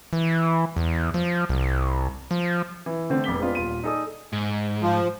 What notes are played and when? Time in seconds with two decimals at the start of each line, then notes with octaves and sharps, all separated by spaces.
0.13 E3
0.77 E2
1.14 F3
1.49 C2
2.31 F3
2.86 E3
3.10 D3 A3 C4
3.24 F1 B3 D6 B6 G7
3.38 G#3 B3 C4 D4 F4
3.55 D#1 F4 D#7
3.83 D#4 G#4 A4 D5 D#6
4.33 G#2
4.82 F3